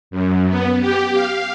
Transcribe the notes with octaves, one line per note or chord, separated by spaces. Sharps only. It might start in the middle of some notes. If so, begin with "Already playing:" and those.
F#2
B3
G4
F5